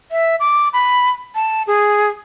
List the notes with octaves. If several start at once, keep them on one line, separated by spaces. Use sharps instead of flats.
E5
D6
B5
A5
G#4